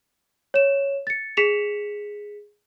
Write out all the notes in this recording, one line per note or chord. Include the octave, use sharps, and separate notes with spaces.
C#5 E7
A6 C#7
G#4 B6 C#7 E7 F7